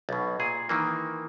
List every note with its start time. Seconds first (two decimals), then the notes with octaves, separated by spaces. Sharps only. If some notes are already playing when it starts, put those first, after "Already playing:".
0.09 B1 B2
0.40 A#2 G#4
0.69 D#3 E3 A#3